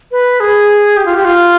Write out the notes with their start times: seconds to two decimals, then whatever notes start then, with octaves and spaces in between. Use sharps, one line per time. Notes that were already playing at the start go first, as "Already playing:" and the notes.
0.11 B4
0.40 G#4
0.97 G4
1.06 F4
1.15 G4
1.25 F4